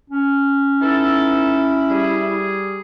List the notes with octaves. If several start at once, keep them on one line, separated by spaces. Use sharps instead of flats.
C#4
B3 D#4 E4 A4
G3 G#4